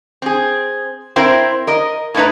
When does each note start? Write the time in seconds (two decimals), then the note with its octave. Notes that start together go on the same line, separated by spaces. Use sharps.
0.22 C4 G#4
1.16 C4 E4 A#4 C5 G5
1.67 A#4 D#5
2.14 A2 A3 D4 D#4 B4 A#5